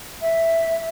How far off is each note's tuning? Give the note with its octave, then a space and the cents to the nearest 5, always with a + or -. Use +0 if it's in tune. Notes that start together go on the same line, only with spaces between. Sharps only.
E5 +0